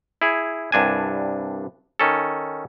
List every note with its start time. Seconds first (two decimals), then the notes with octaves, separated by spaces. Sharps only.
0.22 E4 G#4
0.72 C2 G2 D4 G#5
2.00 D#3 C#4 A4